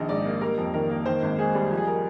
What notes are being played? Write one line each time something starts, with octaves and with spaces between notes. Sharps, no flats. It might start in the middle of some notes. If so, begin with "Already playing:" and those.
Already playing: A#1 D#3 D#5
G#2 D5
A#3
G3 A#4
F2
D#3 A#4
A#3
D#3 C5
G#1
G#2 G#4
G3
F3
G#4
A#4